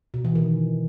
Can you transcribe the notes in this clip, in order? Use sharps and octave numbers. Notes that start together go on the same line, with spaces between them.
B2
E3
D#3